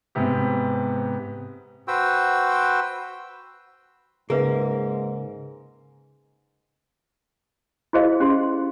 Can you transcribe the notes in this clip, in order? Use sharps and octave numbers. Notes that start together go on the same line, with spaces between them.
G#2 C3 B3 G4
F#4 B4 C5 G5 E6
G#2 C#3 A#3 G#4 B4 E5
E4 F#4 G#4 C5 D#5 F5
C#4 G4 G#4 C6